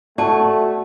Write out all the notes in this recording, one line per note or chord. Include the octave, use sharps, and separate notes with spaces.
A3 F#4 D5 A5